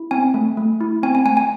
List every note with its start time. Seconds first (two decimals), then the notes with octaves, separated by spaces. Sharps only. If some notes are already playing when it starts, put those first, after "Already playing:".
Already playing: E4
0.11 C4 G#5
0.34 A3
0.57 A3
0.81 E4
1.03 C4 G#5
1.15 G#5
1.25 A3 G#5
1.37 G#5